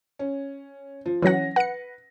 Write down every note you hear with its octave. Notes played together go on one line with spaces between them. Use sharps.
C#4
F3
E3 F#3 C#4 F#5 A#6
B4 F#5 C#7